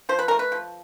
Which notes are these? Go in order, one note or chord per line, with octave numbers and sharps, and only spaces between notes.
F3 C5
B4
A3 A#4
B4
F3